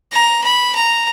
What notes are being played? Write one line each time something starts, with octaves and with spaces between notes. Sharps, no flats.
A#5
B5
A#5